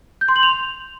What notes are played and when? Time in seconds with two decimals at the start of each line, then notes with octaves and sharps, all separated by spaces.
0.21 G6
0.28 C6
0.36 F#7
0.43 F7